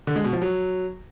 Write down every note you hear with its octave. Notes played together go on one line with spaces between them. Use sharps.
D3
G#3
B2
F3
F#3